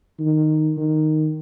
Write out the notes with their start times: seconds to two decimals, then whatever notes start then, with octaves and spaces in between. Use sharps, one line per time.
0.19 D#3
0.77 D#3